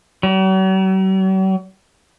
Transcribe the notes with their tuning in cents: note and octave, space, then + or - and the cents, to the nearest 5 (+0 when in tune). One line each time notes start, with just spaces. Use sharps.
F#3 +45